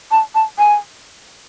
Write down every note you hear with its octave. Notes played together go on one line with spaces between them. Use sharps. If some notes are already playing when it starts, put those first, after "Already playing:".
A5
A5
G#5